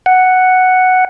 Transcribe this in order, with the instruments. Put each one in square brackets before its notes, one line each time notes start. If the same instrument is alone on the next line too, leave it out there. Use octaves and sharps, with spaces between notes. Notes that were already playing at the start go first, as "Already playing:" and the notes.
[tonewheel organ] F#5